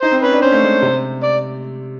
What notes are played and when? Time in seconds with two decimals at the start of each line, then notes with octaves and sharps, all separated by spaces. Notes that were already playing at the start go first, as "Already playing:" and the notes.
0.02 D#4 C5
0.12 C4
0.23 C#4 B4
0.33 D4
0.42 C#4 C5
0.52 A3
0.63 G#3
0.82 C3
1.23 D5